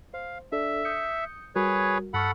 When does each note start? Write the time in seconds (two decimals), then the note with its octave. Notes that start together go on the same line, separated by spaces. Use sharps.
0.14 C5 F5
0.52 D4 A4 D5 E5
0.85 D#6 G6 C#7
1.55 G3 F#4 G#4 A#4 B4 C#5
2.14 G2 A4 F#5 B5 C#6 F6